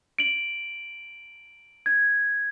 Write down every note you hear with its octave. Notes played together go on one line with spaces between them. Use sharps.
D7 F#7
G#6